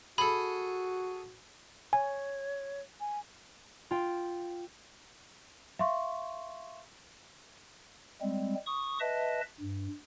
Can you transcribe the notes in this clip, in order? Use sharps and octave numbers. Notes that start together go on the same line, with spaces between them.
F#4 G#4 A4 B5
C#5 G#5
G#5
F4 G5
E5 F5 C6 C#6
G3 G#3 C4
C#6 D#6
B4 D#5 E5 A5
G2